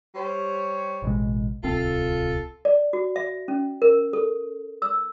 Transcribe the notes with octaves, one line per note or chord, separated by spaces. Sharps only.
G3 C5 C#5
A1 B2 G#3
D1 C2 C4 F4 A4
D5
F#4
E5
C#4
A#4
A4
E6